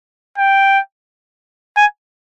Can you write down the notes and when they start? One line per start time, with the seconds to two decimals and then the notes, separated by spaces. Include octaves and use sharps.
0.38 G5
1.77 G#5